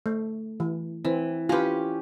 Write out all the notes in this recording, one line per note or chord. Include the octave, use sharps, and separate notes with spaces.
A3
E3
E3 C4
C#4 F4 G4 B4